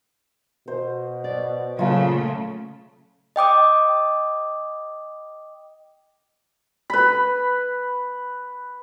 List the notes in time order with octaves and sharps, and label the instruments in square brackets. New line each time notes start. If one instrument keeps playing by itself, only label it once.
[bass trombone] B2 [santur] C5
[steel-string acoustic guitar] D5
[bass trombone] A#2 [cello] C#3 A3 [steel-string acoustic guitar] F#3 [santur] F4 A5
[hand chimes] D#5 G5 D6 D#6
[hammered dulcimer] B4 B5